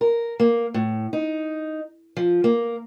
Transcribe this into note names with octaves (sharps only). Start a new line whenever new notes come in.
A#4
A#3
A2
D#4
F3
A#3